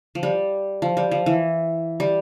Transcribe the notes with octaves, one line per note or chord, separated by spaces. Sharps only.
F3
G3
F3
G3
F3
E3
G3